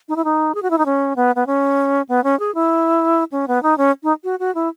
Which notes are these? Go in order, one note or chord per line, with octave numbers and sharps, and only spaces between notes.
D#4
E4
D#4
G#4
F#4
E4
D#4
C#4
B3
B3
C#4
B3
C#4
G#4
E4
C#4
B3
D#4
C#4
D#4
F#4
F#4
E4